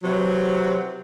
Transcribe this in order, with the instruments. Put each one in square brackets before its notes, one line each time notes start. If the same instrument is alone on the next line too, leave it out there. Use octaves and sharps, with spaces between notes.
[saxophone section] C3 E3 F#3